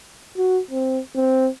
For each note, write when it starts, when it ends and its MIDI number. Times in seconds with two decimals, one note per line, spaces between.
0.37 0.60 66
0.71 0.99 60
1.15 1.49 60